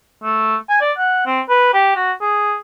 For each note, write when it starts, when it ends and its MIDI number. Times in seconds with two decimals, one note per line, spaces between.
0.23 0.55 57
0.69 0.78 80
0.81 0.92 74
0.98 1.22 78
1.26 1.41 60
1.49 1.69 71
1.74 1.93 67
1.96 2.12 66
2.21 2.55 68